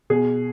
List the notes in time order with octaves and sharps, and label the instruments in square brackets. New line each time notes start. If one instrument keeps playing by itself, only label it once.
[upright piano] B2 G#4